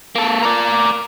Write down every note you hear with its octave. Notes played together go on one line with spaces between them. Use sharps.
A#3 A4
A#4 D5